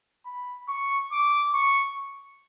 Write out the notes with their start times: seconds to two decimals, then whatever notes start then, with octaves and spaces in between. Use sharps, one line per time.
0.26 B5
0.69 C#6
1.12 D6
1.54 C#6